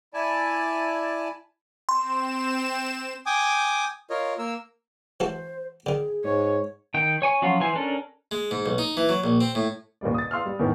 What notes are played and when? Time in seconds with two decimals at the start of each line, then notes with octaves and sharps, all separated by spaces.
0.14 E4 D5 G#5 A5
1.89 C4 C6 E7
3.26 G5 G#5 D6 D#6
4.10 F4 A#4 C#5 D#5
4.39 A#3 A#4 E6
5.20 E3 F#4 A4 C5
5.86 D3 D#3 G#4
6.24 G#2 C#5
6.94 D#3 G5
7.22 C#5 G#5 C#6
7.42 F3 F#3 C#4 F4 F#4
7.60 E3 C5 G#5
7.75 C#4 D4 A4 A#4
8.31 G#3
8.51 G#2
8.66 B1
8.78 D#4
8.97 E3
9.09 F#3
9.24 A#1
9.41 C4
9.55 A2
10.01 D#2 A#2 G3 D5
10.14 D#6 A6
10.31 F5 C6 E6 F6
10.46 G3
10.59 E2 A2 D#3